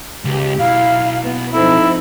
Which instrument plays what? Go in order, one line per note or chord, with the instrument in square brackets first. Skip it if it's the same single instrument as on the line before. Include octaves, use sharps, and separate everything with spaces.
[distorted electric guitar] C#2 [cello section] G#3 G4
[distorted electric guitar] B1 [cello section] E4 [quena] F5
[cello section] B3
[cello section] F3 C4 D#4 [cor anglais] E4 [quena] A4